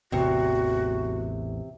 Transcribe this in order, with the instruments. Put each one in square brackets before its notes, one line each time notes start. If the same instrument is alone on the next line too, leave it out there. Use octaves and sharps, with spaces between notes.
[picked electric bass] A1 E2 [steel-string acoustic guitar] C3 [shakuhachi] F#4